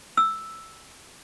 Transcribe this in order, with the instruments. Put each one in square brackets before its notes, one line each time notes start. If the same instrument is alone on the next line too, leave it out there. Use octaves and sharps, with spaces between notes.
[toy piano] E6